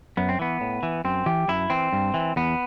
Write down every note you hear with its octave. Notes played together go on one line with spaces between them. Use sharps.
F#2 B3
C4
E3 B3
A2
E3
F#2 C4
E3 G4
F#2 E4
E3 C4
G2
E3
E2 B3